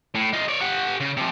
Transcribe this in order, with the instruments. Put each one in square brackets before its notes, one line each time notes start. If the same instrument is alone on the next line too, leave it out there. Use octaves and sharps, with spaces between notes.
[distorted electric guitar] A2
D#4 F4
C#5 D5
G4 F#5
C#3
C3 F3